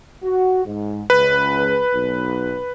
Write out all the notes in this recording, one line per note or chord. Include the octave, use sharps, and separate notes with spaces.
F#4
G#2
C#2 B4
B1